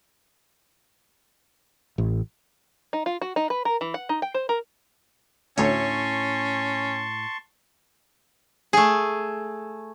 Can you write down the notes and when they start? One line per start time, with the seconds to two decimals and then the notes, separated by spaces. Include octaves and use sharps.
1.98 A1
2.93 D#4
3.06 F4
3.22 F#4
3.36 D#4
3.50 B4
3.65 A#4
3.81 E3
3.94 F#5
4.09 D#4
4.22 G5
4.34 C5
4.49 A#4
5.58 D2 A2 C#4 C#5 A5 C6 C#6
8.73 A3 G#4